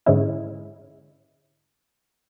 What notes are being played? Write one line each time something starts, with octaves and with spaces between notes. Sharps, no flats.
G#2 D3 G#3 C#4 E4